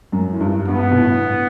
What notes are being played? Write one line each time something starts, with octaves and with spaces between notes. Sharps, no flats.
F#2
A2
G2
G2 B3
B2
A2